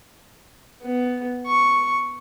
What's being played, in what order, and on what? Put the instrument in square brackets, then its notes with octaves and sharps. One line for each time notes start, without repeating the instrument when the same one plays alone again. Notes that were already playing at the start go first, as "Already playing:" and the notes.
[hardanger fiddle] B3
C#6